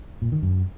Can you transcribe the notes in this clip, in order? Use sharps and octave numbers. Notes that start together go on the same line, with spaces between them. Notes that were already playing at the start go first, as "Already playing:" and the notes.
A#2
D#3
F#2